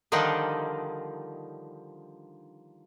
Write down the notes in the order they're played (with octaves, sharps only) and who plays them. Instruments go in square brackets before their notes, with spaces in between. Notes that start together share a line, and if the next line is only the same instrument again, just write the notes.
[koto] D3 D#3 F3 G3 D4 D#4